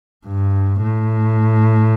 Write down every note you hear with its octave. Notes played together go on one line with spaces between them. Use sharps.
G2
A2